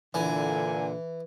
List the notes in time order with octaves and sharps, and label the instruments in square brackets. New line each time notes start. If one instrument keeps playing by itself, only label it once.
[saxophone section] A#2 D3 [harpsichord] E3 [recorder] G#5